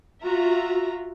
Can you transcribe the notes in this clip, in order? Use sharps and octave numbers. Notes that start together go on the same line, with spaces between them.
F4 F#4 E5 A#5